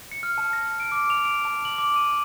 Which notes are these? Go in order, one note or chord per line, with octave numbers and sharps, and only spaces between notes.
C#7
F6
A5
A#6
D7
D6
F7
D7
A5
F#7
D6
D#7